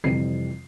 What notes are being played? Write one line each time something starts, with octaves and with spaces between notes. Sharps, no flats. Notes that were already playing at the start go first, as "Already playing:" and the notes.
F2 C3 E3 G3 C4 C7